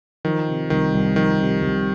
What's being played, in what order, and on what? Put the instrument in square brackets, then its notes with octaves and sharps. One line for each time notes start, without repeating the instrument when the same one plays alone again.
[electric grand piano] D#3 [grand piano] F3
[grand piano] C3
[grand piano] C2 [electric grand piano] D#3
[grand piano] C2
[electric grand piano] D#3 [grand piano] F3
[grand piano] C3
C2